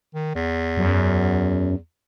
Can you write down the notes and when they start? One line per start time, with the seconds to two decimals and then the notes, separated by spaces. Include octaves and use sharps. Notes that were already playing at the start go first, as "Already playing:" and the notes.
0.15 D#3
0.35 E2
0.77 F#2